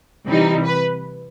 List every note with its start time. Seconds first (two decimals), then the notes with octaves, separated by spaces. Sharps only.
0.25 C3 E3 G3 D#4
0.65 B4